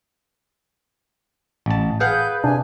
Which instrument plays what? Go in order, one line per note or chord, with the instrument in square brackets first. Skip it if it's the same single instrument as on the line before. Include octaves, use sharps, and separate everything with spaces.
[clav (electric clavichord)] A1 A5
[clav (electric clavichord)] G#4 F5 F#5 [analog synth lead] B4 [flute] G6
[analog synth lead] C3 [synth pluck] D4 [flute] G#5